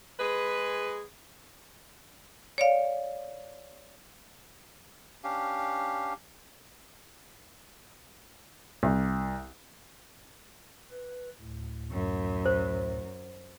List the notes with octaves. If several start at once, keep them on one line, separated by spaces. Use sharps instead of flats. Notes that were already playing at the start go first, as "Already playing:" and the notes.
G#3 G#4 B4
C#5 D5 F5
C#4 D4 G4 F5
C2
B4
D2 A2
F#2
C5